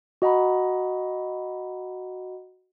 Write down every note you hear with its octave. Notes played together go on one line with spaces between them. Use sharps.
F#4 D#5 F#5 A#5 B5